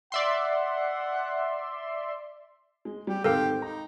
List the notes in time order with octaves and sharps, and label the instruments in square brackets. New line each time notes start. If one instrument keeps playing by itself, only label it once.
[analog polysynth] D5 E5 C6 [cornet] F#5
[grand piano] G#3
[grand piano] G3 [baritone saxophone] G4
[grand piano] G#2 D#3 C4 [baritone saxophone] G4 [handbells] A4 A#4 F5
[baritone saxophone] D#4 [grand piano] A#5